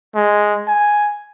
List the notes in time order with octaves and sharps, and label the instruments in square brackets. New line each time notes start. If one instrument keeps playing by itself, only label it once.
[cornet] G#3
G#5